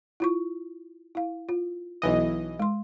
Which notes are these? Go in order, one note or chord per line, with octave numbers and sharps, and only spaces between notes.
E4 F4 C#6
E4 F5
F4
B1 E3 D#5
G#3 C6